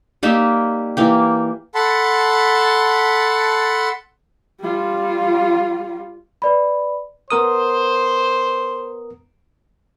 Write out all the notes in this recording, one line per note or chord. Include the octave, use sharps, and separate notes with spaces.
G3 A#3 D#4 E5
E3 A#3 G4
A4 F#5 A5 B5 C6
G3 F4
B4 D5 B5
B3 A#4 C5 D#6